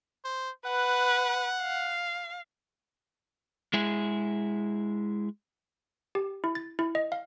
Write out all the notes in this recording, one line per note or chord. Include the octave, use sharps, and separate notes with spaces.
C5
B4 F#5
F5
G#3 E4 G#4
G4
E4
A6
E4
D#5
F5